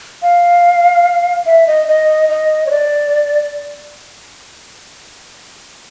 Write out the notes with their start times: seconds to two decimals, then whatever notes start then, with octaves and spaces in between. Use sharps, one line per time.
0.22 F5
1.46 E5
1.67 D#5
1.88 D#5
2.29 D#5
2.67 C#5
2.71 D5